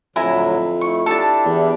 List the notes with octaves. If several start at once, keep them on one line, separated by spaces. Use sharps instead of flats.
F2 A2 D3 F#3 E4 G#5 A#5
A3 E4 C#6
D4 E4 G4 A4 A5
E2